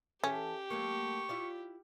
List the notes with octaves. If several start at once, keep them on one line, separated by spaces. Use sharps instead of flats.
E3 C#4 G4 A4 E5
F#3 A3 A#3 C#6
E4 F4 D5